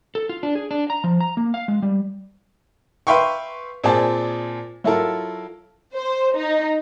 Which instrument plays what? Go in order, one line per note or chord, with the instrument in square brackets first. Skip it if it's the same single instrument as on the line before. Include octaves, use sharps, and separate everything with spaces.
[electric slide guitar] A4
F4
D4
G#4
D4
A#5
F3
A#5
A#3
F5
G#3
G3
[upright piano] B4 E5 F5 G5 C6 C#6
A#2 C4 G#4 D5 A5
F#3 E4 F4 A4 A#4
[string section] C5
D#4